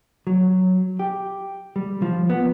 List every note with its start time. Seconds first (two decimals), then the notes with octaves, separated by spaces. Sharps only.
0.27 F#3
0.99 G4
1.76 G3
2.02 F3
2.30 B3